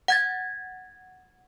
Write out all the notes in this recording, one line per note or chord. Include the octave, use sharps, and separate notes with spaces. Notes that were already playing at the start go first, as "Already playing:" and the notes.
F#5 G#6 A6